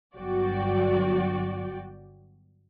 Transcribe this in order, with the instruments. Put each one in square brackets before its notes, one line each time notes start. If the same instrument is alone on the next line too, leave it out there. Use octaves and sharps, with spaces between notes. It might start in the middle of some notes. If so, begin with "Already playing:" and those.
[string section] G1 F#3 F#4 D5 G5